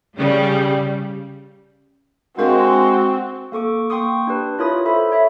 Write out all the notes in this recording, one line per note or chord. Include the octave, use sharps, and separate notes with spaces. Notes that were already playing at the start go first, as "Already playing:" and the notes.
C#3 G3
G#3 C4 D4 F#4 A#4 F5
A#3 A4 C#6 D6
A#3 G5 C6 C#6 D#6
D4 G4 B4
E4 F4 A#4 C#5 B5 D#6
A4 C5 E5 B5
C#5 E5 B5